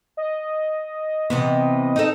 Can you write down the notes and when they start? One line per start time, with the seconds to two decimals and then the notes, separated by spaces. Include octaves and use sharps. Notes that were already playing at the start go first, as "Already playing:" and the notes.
0.17 D#5
1.30 C3 E3 B3
1.96 D#4 A4